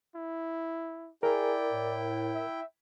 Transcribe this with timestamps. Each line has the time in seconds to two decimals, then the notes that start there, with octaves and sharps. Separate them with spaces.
0.15 E4
1.23 E4 G#4 A#4 D5 G5
1.71 A2
2.34 E5